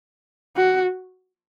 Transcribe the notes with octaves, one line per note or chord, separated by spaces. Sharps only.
F#4